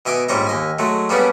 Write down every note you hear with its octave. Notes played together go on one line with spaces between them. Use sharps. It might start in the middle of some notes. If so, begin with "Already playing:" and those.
B2 D#5 E5 G#5 D6 D#6
A#1 G#2 G3 C#5 D#5 A#5
D#2 D#5 G#5
F#3 G#3 A3
G3 A#3 B3 C#4 D4 G#4